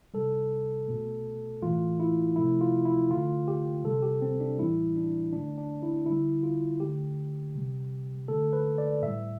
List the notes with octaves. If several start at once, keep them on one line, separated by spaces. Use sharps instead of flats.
C3 G3 A4
B2 A3
A2 E3 A3 F4
E4
C3 F3 A3 E4
F4
E4
D3 A3 F4
G4
C3 G3 A4
G4
C4
D4
A2 E3 G3 E4
D4
D3 A3 D4
D4
E4
D3 G3 E4
F4
D3 A3 G4
C3 G3
D3 A3 A4
B4
D5
A2 G3 E5